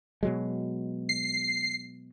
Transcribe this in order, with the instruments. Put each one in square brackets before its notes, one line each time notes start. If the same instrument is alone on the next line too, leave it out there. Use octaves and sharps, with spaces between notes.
[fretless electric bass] B2 F#3 G#3
[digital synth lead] C7